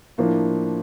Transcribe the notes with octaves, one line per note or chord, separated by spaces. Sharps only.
A2 F3 A#3 D4